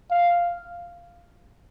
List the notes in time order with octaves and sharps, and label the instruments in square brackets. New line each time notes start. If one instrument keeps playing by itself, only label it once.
[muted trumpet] F5